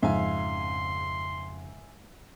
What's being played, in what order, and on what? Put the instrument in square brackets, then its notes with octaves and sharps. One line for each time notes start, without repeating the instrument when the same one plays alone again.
[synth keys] F2 C#3 [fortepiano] G#2 [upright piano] E5 F5 G#5 [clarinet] C6